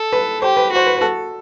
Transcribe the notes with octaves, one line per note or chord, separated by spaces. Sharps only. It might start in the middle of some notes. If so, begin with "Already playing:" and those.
Already playing: A4
B4
G4 C5
B4
F#4 C5
B4
B4
A4